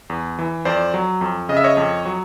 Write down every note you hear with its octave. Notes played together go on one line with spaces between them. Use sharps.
E2
E3
F2 C5 D5
F#3
F2
C#3 D#5
E5
C#5 D#5
F2
F#3